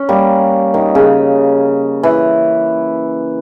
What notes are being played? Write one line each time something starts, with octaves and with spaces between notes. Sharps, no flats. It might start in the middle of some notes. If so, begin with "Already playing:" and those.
Already playing: C#4
G3 A#3
D#3
C#3
E3